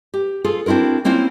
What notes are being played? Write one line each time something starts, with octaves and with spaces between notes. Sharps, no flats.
G4
F4 G#4 A4
C4 D4 E4 F#4 A#4
A#3 C4 C#4 E4 F4